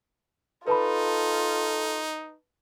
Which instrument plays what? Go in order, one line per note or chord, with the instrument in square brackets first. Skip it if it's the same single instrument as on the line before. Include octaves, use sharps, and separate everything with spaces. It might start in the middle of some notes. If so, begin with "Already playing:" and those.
[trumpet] D#4 [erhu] F4 [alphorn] A4 [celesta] B4 A5 B5